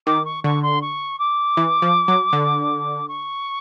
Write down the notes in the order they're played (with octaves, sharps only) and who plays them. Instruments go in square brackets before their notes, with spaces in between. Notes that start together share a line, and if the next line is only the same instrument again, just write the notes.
[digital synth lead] D#3 [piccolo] D6
[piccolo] C#6
[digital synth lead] D3 [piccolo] C#6
[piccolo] C6
C#6
D6
[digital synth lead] E3
F3
F#3
D3
[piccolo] C#6